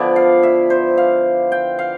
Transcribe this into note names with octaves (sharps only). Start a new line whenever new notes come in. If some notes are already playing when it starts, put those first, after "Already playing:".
Already playing: D3 F3 B3 E4 D5
F5
E5
C5
F5
G5
F5